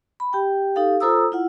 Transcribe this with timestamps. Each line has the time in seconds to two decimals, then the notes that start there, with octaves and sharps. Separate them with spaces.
0.20 B5
0.33 G4 G5
0.76 D#4 G4 A4 F5
1.00 F4 A4 C5 A#5 D#6 E6
1.32 E4 F4 F#5